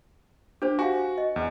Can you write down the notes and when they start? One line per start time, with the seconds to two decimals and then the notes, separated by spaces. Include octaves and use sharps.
0.62 D4 G4 C5
0.79 F#4 F5 G#5
1.18 D#5
1.36 E2